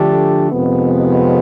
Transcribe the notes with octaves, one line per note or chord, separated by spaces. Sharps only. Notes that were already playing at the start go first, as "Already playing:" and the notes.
Already playing: D3 F3 A3 D4 G4
F2 C3 D#3 G#3 B3